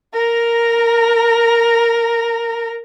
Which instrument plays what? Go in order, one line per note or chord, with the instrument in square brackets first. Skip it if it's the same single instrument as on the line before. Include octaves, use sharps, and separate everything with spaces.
[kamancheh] A#4 A#5